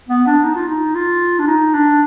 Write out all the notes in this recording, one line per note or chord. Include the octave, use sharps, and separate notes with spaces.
B3
D4
D#4
F4
D#4
F4
D4
D#4
D4